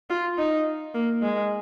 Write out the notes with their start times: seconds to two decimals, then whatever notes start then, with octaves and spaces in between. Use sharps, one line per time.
0.10 F4
0.38 D#4
0.94 A#3
1.22 G#3